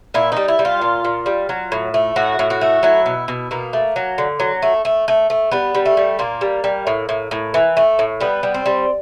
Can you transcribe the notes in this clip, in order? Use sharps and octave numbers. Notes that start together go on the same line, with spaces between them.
A#2 E4
G3 D#4
E4
G3
F4
A#2
A#2
G3
F#3
A2
A3
A2 F#4
A2
F#4
A3
F#3 E4
B2
B2
B2 A#3
A3
F#3
D3
F#3
A3
A3
A3
A3
G3 B3
G3
A3
G3
A#2 A#3
G3
G3
A2
A2
A2
E3
A3
A2
G3 B3
G3
C4
G3